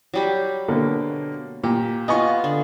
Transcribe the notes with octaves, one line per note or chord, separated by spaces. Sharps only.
F#3 G3 G4
B2 D3 A#3
A#2 G4
B3 F4 D#5 G#5 C#6
D3